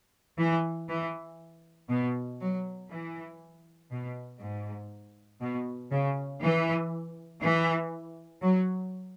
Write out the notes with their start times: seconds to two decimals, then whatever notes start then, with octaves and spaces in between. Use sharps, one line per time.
0.39 E3
0.89 E3
1.90 B2
2.41 F#3
2.90 E3
3.91 B2
4.41 G#2
5.41 B2
5.91 C#3
6.42 E3
7.42 E3
8.42 F#3